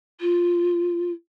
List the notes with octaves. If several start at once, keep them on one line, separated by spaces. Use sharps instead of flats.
F4